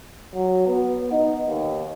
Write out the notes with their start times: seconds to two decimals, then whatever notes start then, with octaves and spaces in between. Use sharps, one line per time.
0.34 F#3
0.67 B3
1.12 D#4
1.47 D#2